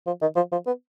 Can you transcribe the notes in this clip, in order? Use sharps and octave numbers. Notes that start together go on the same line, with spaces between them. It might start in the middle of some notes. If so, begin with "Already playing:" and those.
F3
D#3
F3
F3
B3